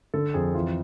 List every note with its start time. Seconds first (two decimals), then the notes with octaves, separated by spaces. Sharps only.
0.14 D3 A4
0.34 F2 G#4
0.54 E3 F4